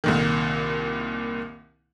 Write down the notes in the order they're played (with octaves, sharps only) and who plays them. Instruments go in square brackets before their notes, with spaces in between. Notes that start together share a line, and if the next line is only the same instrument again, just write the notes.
[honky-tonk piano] C2 A#2 D#3